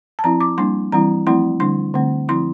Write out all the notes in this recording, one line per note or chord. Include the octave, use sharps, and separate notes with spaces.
A5
F3 C4 E4 A#5
D6
G3 A#3 D4 C6
E3 G3 C4 E4 A#5
F3 A3 C4 E4 C6
D3 G3 D4 C6
D3 A3 C4
F3 C4 E4 C6